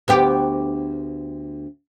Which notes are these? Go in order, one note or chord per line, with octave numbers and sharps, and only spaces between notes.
D2 B3 G4